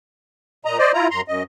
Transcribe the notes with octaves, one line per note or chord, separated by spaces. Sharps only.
A#2 D#5 A#5
C5 D5 D#5
E4 F4 A#5
F#2 A#5 C6
F#2 D#5